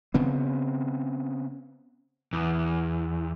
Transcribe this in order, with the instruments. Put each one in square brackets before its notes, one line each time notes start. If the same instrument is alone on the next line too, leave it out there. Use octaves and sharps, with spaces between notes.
[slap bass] C#3 B3 C4
[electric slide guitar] E2